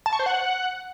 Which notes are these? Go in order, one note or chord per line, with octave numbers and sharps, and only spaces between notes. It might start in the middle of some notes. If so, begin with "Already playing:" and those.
A5
C#6
C5
F#5